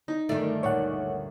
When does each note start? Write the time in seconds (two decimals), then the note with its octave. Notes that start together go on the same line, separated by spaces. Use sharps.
0.08 D#4
0.29 G1 D#3 A3 D5
0.63 D2 A#2 C#5 F#5